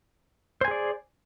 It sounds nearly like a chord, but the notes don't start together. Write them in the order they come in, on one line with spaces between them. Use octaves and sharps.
C5 G#5 G#4 D5